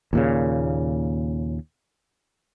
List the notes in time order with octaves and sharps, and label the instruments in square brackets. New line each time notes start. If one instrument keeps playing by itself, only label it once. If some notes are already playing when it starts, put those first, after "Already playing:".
[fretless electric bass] D#2 A#2 C#3